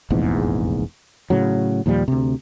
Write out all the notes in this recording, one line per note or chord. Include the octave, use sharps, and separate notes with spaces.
F1 A#1 E2 G#2
A2 C#3 F#3
D#2 A#2 F3 G3
D2 C3